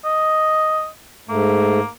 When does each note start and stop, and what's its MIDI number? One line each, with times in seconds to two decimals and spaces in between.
0.05 0.88 75
1.29 1.80 44
1.29 1.80 57
1.29 1.88 58